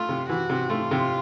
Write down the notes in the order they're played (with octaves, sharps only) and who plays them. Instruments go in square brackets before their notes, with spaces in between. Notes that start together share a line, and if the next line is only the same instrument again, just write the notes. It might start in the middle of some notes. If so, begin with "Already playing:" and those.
Already playing: [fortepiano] A3 [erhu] F4
[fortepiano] C3
[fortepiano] E3 [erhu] F#4
[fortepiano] C3
[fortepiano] A3 [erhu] F4
[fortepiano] C3